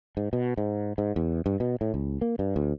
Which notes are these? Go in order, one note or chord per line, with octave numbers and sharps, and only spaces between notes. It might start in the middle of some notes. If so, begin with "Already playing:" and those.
G#2
B2
G#2
G#2
E2
G2
B2
A2
C#2
A#3
G2
D2